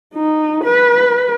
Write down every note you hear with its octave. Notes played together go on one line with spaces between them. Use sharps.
D#4
B4